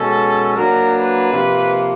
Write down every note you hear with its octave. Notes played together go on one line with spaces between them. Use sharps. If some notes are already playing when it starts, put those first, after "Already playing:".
Already playing: B2 G#3 C#4 A4
F#3 A#3 D4 A#4
B4
C3 F3 A#3